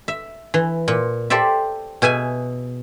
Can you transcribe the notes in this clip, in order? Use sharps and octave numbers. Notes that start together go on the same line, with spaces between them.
E5
E3
A#2
G4 A4 C5 D5 E5
B2 G#4 E5 G#5